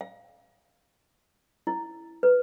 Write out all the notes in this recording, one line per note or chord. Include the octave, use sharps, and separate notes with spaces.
F5
E4
B4